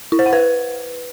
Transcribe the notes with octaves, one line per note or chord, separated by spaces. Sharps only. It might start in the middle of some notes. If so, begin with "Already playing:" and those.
E4
C5
F#5
B4